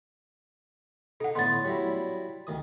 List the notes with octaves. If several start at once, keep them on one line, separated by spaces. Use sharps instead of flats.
D#4 A4 F#5
A2 D3 B3 C6 A6
F#3 G3 E4
D2 D#3 D#6